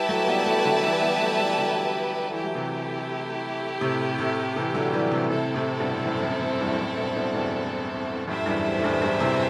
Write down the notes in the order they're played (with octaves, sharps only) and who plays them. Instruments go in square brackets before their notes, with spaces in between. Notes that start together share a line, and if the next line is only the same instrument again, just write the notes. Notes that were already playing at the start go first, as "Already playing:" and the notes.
Already playing: [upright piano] G3 [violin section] E4 G4 B4 E5 A5
[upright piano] F#3 A3
G3 B3
F#3 A3
D3 F#3
E3 G3
G3 B3
G3
F#3 A3
E3 G3
D3 F#3
[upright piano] E3 [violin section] A3 E4 G4
[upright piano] F#3
C3 E3
A2 C3
A2 C3
C3 E3
D3 F#3
E3 G3
C3 E3
[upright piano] A2 C3 [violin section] C4 E4 A4
[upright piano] A2 C3
G2 B2
F#2 A2
F#2
F#2
E2 G2
F#2 A2
G2 B2
G2 B2
E2 G2
[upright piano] F#2 A2 [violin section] A3 E4 G4 C5 E5
[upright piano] E2 G2
A2
E2 G2
E2 G2
C3 E3